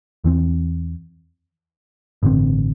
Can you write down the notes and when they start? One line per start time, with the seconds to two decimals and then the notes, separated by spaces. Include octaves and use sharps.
0.24 E2 E3 C4
2.23 A1 G2 D3 C4